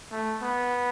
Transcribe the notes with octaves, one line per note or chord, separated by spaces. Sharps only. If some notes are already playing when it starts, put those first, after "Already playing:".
A3
B3